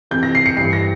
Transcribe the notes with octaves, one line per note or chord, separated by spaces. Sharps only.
F2 C3 E3 G6
A#6
C7
C#7
G2 E3 C7
A#6